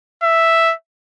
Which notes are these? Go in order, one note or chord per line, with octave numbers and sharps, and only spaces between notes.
E5